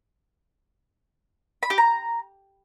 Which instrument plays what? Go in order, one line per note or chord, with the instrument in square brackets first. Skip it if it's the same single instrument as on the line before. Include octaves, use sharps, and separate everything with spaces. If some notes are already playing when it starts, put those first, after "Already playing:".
[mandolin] B5
G4
A#5